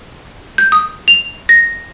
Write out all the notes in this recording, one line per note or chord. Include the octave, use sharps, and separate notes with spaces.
G6
D#6
F7
A#6